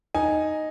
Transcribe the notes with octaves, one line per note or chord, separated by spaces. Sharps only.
D#4 G#5